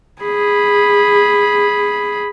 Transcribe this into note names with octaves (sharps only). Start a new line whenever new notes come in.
G#4 B5